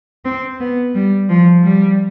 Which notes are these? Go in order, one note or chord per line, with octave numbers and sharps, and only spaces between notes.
C4
B3
G3
F3
G3